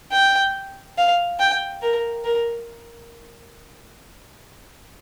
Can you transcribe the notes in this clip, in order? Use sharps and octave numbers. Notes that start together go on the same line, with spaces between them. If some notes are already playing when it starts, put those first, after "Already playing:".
G5
F5
G5
A#4
A#4